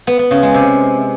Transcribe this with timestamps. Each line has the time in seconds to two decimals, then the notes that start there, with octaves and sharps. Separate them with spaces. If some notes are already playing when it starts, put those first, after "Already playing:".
0.07 B3
0.19 B3
0.31 C#3
0.43 G#3
0.54 C3